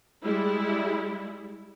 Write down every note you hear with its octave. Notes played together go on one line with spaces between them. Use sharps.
G3 G#3 E4